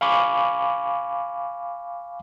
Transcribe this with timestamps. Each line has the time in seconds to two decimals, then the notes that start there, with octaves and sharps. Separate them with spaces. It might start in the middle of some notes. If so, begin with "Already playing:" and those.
0.01 F5 G#5 B5 C#6 D6